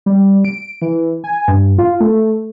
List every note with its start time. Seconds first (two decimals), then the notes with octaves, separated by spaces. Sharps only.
0.06 G3
0.45 D7
0.82 E3
1.24 G#5
1.48 G2
1.78 F4
2.00 A3